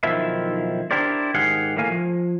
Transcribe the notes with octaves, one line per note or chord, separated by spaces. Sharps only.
B1 D#3 F3 E4 E5
D4 E4 G4 A#4 C5 D5
G#2 D#3 G4 G#4 F5 F#5
A2 A3 A#3 F5 G#5
F3